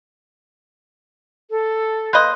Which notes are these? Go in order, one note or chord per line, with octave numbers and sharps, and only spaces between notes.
A4
A#3 B4 D#5 C6 F#6 G6